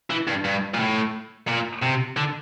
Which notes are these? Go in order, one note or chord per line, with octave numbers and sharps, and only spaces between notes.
E3
G2
G2
A#2
A2
A#2
C3
D3